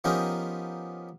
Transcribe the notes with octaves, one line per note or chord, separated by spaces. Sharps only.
F3 B3 C#4 D#4 G4 A#4